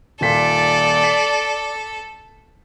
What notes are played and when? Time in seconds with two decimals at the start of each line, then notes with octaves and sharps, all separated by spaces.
0.21 D#1 A#2 A4 D5 B6
1.04 B6